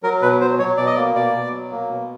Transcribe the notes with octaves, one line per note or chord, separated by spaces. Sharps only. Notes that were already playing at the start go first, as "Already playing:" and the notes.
F#3 A#4
B2 B4
F#3 C5
F#3 C#5
B2 D5
D#5
A#3 D5
B2 D5
B2
F#3
A#3
B2